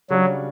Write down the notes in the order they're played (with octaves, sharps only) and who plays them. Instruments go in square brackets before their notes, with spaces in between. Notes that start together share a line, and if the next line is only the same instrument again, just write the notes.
[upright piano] C#3 G3 D4 F#4 C#5 [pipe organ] F#3